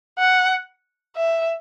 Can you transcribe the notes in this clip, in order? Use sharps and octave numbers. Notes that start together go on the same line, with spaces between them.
F#5
E5